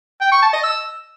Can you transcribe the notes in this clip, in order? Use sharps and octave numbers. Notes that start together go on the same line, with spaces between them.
G5
C#6
A5
D#5
E6